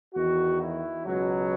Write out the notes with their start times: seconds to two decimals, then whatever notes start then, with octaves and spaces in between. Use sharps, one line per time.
0.14 E2 D#3 F#4
0.60 E4
1.05 C#2 B2 F#3